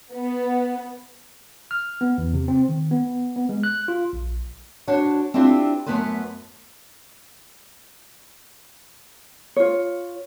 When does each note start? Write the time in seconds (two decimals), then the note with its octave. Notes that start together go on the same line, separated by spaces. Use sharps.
0.13 B3
1.71 F6
2.01 B3
2.18 E2
2.34 C3
2.48 C4
2.69 D#3
2.91 B3
3.36 B3
3.49 G#3
3.63 F#6
3.88 F4
4.13 A#1
4.88 D4 F#4 C5 C#5
5.34 C4 D4 E4 F4 G4 B4
5.86 F#2 E3 A3 B3 B4 C5
9.56 F4 C#5